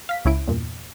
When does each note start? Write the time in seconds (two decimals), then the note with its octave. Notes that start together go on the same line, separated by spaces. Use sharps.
0.09 F5 B6
0.25 C#2 C#4 E4 D7
0.48 E2 G2 A#2